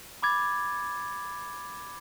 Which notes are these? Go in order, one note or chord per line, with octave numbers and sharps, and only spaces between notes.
B5 D6 G#6 A6